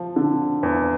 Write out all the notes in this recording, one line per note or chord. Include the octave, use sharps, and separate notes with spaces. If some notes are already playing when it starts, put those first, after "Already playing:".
Already playing: F3
D3
E2